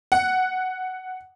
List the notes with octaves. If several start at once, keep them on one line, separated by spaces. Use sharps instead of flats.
F#5